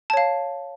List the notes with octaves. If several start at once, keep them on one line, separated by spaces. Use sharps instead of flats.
C#5 F5 A5